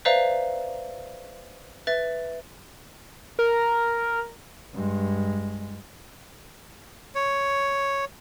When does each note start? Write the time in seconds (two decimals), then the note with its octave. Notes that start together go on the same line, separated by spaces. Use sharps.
0.05 B4 C5 D5 E5 F5 A#5
1.87 B4 E5 A6
3.39 A#4
4.74 G2 G#3
7.15 C#5